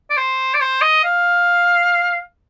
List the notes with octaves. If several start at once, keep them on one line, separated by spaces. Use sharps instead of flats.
D5
C5
D5
C5
D#5
F5